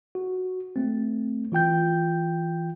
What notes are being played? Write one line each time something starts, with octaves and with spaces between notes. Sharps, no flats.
F#4
A3 C4
E3 F4 G5 G6